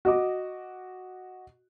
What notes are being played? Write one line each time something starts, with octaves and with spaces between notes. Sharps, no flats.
F#4 D#5 D6